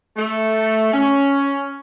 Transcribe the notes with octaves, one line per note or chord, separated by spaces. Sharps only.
A3
C#4